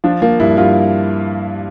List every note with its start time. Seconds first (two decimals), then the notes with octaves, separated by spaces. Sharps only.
0.04 F3 D4
0.22 F3 A#3
0.40 G2 E4
0.57 G2 F4